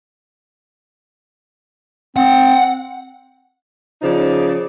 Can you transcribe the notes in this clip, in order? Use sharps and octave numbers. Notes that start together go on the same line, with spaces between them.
C4 F#5
C#3 F3 D#4 D5